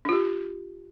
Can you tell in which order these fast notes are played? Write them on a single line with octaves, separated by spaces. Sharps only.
D4 F4 G4